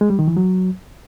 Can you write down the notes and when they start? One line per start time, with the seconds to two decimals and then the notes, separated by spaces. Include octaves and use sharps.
0.01 G#3
0.10 G3
0.19 D#3
0.28 E3
0.37 F#3